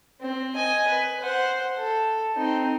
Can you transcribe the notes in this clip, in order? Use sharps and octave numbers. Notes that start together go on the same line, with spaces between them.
C4
D#5 G#5
B4
C5 F#5
A4
C4 D#4